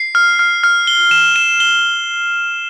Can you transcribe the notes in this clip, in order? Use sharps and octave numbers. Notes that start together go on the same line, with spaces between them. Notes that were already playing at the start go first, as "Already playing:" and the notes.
Already playing: C7
F6
F6
F6
G7
E7
E7
G7